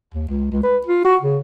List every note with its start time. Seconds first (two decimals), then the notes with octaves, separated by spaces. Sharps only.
0.14 D#2
0.28 C#2
0.51 C#2
0.63 B4
0.86 F4
1.05 F#4
1.21 C#3